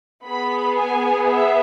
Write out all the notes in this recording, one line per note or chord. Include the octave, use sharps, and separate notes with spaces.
B3 G#4 B5
G#5
E5